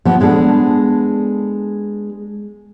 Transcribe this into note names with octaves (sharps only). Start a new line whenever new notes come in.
F3 B3
G#3 B3 D4 A4